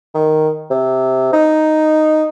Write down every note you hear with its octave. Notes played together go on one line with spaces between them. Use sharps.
D#3
C3
D#4